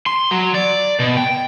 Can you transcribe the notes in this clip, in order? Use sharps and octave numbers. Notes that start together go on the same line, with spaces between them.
C6
F#3
D5
B2
G5